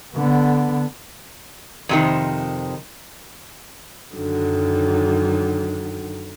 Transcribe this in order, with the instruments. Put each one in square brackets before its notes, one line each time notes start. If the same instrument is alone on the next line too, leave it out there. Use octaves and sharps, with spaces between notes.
[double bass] D3 B3
[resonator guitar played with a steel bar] F2 C3 D#3
[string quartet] F#2 D3 D#3 F#3